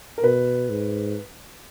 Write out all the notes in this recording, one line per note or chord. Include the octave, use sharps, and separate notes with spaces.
A#4
B2 B4
G#2